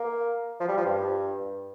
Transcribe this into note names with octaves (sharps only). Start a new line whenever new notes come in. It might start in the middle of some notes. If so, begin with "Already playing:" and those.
Already playing: A#3
F3
G3
F3
G2